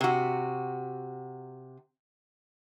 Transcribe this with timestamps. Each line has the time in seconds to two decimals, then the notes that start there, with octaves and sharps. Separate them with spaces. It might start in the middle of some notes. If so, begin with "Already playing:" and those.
0.01 C3 F#4